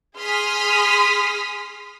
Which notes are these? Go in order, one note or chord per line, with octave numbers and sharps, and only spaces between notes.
G#4 C6 D#6 F6 B6